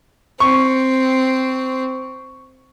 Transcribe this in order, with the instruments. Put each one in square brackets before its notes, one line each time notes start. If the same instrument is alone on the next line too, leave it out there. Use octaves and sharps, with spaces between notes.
[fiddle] C4 [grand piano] C#6